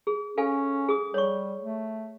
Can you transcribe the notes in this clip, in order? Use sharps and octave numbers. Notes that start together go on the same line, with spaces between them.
G#4
C#4 A4 F5 G#5
G#4 D#6
G3 C#5 C#6
A3